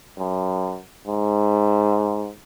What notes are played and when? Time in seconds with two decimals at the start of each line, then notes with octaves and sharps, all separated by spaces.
0.17 F#2
1.06 G#2